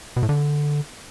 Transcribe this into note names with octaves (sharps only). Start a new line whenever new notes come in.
B2
A2
D3